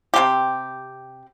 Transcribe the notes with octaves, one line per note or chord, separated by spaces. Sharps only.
C3 F3 C4 G4